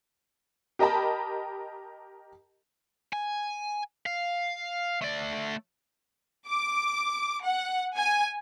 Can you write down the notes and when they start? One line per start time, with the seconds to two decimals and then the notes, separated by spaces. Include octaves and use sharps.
0.79 G4 A#4 D#5 G5 A5 B5
3.13 G#5
4.06 F5
5.02 A3 D5
6.48 D6
7.44 F#5
7.96 G#5